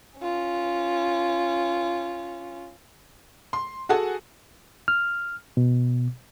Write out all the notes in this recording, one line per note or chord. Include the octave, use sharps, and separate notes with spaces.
C#4 F4
C6
F#4 G#4 A4 F#5 G#5
F6
B2